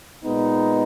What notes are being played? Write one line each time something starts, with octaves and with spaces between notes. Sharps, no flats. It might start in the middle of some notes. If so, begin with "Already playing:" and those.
A#2 G#3 B3 D#4